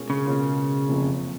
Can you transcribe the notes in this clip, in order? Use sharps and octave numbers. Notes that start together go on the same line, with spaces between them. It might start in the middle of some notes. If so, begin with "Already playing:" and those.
Already playing: B2 G#3 C#4 F4 A#4
C#3
B2 G#3 C#4 F4 A#4
F#1 F2 C3 F3 A3